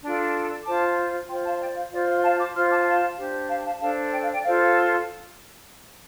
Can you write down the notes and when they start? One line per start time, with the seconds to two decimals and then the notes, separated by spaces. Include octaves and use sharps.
0.03 D4 F4 A4
0.66 F4 C5 A5 D6
1.28 F4 C5 G5 C6
1.44 F5 A5
1.60 D5 G5
1.76 F5
1.91 F4 C5 D5
2.08 F5
2.23 F5 A5
2.38 A5 D6
2.54 F4 C5 C6 F6
2.70 A5 D6
2.86 F5 A5
3.17 D4 G4 C5
3.48 F5 A5
3.65 F5 A5
3.80 D4 A4 C5 F5 A5
4.12 D5 G5
4.22 F5
4.33 D5 G5
4.43 F4 A4 C5 F5